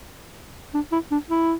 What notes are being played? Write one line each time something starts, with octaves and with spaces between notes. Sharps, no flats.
D4
E4
D4
E4